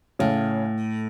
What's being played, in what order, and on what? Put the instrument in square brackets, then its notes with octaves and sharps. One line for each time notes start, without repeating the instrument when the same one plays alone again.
[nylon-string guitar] A2 [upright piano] C#3